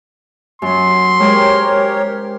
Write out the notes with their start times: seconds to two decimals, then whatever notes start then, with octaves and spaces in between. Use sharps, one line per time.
0.62 F#2 F#3 C6
1.20 G#3 G4 A#4 C5 C#5 G5